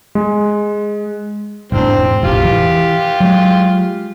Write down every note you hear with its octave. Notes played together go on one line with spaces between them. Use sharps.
G#3
E1 G#2 C4 D4
E1 A1 F4 G4
E3
F#3 G#3